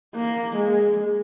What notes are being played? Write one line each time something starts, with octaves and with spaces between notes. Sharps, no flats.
A#3
G#3